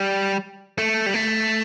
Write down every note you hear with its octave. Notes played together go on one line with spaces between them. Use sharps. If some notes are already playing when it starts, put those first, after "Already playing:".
Already playing: G3
A3
G3
A3